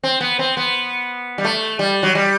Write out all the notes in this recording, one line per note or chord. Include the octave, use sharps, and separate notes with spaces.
C4
B3
C4
B3
G3
A3
G3
F#3
G3